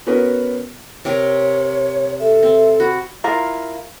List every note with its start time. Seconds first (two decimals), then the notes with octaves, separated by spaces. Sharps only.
0.07 B3 C#4 F#4 A#4 B4
1.05 C3 G4 A#4 C#5
2.20 A4 E5
2.43 C4
2.80 F#4 B5
3.24 E4 F4 A#4 F5